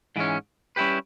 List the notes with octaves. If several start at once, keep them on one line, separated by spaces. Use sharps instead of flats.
G#2 E3 G#3 C#4
G3 C#4 E4 G4 B4